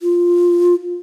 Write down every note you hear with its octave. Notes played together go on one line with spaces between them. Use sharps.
F4